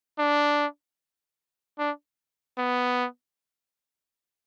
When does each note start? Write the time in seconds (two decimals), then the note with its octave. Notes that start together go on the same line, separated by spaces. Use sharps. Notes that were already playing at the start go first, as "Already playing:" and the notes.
0.19 D4
1.79 D4
2.58 B3